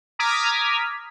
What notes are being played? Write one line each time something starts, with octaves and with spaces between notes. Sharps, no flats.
A#5 D6 D#6 F6 G#6 B6